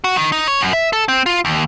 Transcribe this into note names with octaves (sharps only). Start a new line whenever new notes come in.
F#4
D#3
D#4
C#5
F#2
E5
A4
C4
F4
D#2